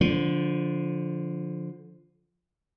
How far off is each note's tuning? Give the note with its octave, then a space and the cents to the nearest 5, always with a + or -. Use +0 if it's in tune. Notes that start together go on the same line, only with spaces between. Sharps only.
D3 -20 F3 +0